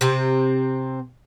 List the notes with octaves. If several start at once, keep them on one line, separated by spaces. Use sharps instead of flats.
C3 C4